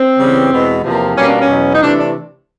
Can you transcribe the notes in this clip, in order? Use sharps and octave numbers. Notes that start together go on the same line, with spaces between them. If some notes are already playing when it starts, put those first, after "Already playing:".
Already playing: C4
C#3 E3 G3 B3
E2 B2 G#3 B3
E2 C3 F3 A#3
B2 G3 A#3 C#4
D4
C#4
E2 B2 F#3
D#4
C3 E3 A3 D4
D4